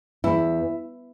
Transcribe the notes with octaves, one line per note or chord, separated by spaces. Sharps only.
E2 E4